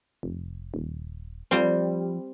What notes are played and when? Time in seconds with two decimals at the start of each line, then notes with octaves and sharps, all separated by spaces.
0.23 F1
0.74 D#1
1.51 F3 G3 C4